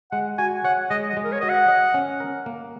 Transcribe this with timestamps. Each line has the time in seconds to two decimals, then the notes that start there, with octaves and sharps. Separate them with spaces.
0.12 G#3 F#5
0.38 F#4 G#5
0.64 C#5 F#5
0.90 G#3 D#5
1.10 D#5
1.17 G#3
1.24 A#4
1.32 C#5
1.41 F#4 D#5
1.49 F#5
1.68 D#5
1.94 C#4
2.20 A#4
2.46 A#3